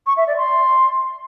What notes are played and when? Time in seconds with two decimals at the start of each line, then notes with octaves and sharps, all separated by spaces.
0.06 C#6
0.17 E5
0.27 D5
0.37 C6